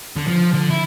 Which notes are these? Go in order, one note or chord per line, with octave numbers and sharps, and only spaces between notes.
D3
F3
D3
E4